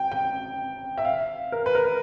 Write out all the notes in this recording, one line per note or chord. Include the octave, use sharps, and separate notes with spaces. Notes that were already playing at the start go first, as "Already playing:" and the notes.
Already playing: G5
G5
E5
F5
A#4
B4
A#4